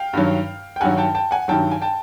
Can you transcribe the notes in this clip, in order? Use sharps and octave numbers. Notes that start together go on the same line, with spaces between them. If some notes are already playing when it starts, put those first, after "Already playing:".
Already playing: F5 G5
G2 D#3 F#3
G5
G2 D#3 F#3 F#5 G#5
G5 A5
G5 A5
F#5 G#5
G2 D#3 F#3 G5 A5
G#5
G5 A5